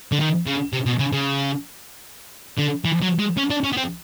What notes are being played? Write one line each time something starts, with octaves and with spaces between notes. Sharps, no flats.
D3
D#3
C#3
C3
B2
C#3
C#3
D3
E3
F#3
G#3
C#4
D4
C#4
B3
C4